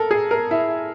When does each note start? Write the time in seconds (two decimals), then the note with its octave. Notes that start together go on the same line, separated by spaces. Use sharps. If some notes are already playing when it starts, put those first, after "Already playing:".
Already playing: A4 A#4
0.11 G#4
0.31 A#4
0.51 E4